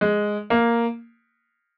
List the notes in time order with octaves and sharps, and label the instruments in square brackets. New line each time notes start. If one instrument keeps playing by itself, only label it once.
[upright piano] G#3
A#3